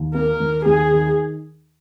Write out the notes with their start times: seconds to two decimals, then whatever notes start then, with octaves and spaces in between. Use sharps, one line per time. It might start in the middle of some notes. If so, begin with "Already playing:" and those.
Already playing: D#2
0.14 A#3 A#4
0.40 D#2
0.65 D#2 G#4
0.91 D#3